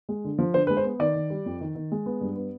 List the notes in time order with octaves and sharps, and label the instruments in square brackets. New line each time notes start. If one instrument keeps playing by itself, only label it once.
[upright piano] G#3
D3
F3
D3 C5
G#3 B4
C5
B3
D#3 D5
D#3
G3
F2
D#3
D#3
G#3
B3
G2
B3